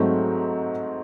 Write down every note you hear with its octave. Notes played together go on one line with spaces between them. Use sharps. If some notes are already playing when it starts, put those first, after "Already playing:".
Already playing: G#2 F#3 A3 C4